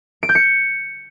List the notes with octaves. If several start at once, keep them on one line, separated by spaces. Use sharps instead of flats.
D7
G6
C#7